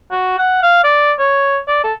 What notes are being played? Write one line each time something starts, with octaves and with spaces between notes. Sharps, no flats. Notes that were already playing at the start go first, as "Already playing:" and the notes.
F#4
F#5
F5
D5
C#5
D5
A4